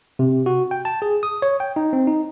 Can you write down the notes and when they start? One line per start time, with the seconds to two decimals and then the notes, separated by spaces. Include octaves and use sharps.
0.19 C3
0.46 F#4
0.71 G5
0.85 A5
1.02 G#4
1.23 D#6
1.42 C#5
1.60 G5
1.76 D#4
1.93 C4
2.07 D#4